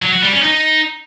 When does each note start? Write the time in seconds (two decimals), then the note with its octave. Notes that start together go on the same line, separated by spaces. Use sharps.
0.02 F#3
0.12 F#4
0.22 G3
0.32 C#4
0.43 D#4